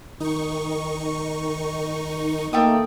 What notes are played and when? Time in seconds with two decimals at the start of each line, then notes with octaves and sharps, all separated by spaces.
0.20 D#3 D#4 C#6
2.53 D#3 A3 A#3 G5 D#6